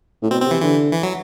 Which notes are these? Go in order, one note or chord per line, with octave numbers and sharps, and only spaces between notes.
A2
B2 C4
C4
C3 E3
D3 E3
E3
F#3